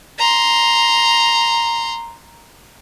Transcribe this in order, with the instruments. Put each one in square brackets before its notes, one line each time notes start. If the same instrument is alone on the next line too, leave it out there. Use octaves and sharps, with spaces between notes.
[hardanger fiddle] A#5 C6